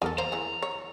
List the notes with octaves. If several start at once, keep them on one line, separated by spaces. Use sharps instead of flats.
E2 A4 A#4 G#5
A#3 C5 A#5
E3 G#4
C#5